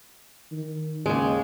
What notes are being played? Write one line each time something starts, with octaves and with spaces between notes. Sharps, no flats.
D#3
D#2 C#3 G#3